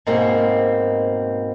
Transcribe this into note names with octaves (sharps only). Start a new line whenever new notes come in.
G#2 B2 A#3 C4